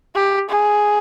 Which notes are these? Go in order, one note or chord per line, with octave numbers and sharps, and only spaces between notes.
G4
G#4